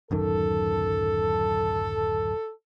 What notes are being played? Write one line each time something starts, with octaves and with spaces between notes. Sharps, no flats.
D1 F#2 D#3 A4